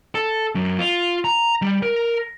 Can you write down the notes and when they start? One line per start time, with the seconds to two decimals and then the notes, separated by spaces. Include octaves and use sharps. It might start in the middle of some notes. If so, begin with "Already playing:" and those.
0.15 A4
0.55 F#2
0.79 F4
1.24 A#5
1.62 G3
1.83 A#4